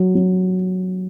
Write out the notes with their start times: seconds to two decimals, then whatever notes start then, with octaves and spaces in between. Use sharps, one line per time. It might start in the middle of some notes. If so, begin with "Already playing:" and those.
Already playing: F#3
0.15 F#3